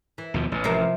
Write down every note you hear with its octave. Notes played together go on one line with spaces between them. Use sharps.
E3
D#2 B2 F3
A1
C3 F3 A#4